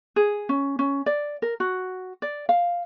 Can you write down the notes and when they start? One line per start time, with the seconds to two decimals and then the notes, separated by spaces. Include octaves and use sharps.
0.16 G#4
0.49 C#4
0.79 C#4
1.06 D5
1.42 A#4
1.60 F#4
2.22 D5
2.49 F5